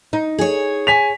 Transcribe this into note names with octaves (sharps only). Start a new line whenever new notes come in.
D#4
G#4 C#5
G#5 B6 F7